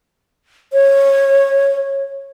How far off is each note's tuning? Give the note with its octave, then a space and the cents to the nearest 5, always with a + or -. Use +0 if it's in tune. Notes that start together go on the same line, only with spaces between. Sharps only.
C#5 -15